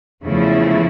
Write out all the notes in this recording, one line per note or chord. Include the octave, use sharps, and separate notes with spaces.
E2 C#3 F3 A3 E4